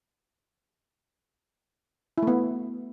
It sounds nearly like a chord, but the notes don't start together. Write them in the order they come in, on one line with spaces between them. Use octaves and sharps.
E4 A3 B3